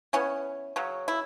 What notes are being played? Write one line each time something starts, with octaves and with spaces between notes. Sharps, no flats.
E3 B3 C#4
C#3 F#3 C#4
E4